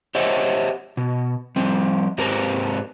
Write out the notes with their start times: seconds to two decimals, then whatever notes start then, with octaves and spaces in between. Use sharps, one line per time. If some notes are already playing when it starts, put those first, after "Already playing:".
0.15 G4 C5 C#5 D#5 E5 F#5
0.97 B2
1.56 F3 G3 C4
2.18 G#2 C4 G4 A#4 B4 A#5